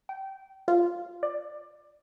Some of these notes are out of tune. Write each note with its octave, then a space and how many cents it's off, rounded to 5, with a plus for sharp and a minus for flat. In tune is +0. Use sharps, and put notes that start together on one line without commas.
G5 -20
F4 -5
D5 +20